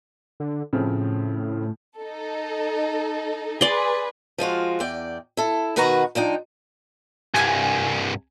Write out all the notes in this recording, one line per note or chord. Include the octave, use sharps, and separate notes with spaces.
D3
A2 C#3 F3 C4
D#4 A4
G#4 B4 D5 C6
F3 G#3 F4 F#4
E2 D5 G5
E4 A4
B2 D#3 F#4 B4 F#5 A#5
F3 D4 D#4 G5
C2 G2 G#5